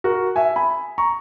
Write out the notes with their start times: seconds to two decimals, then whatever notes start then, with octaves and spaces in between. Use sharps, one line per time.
0.04 F#4 A#4
0.36 E5 G#5
0.56 G#5 B5
0.98 A#5 C#6